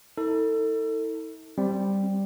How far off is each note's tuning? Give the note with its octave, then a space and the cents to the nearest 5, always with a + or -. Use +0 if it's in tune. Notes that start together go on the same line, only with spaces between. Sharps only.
E4 -45 A4 +25
G3 +0 C4 +0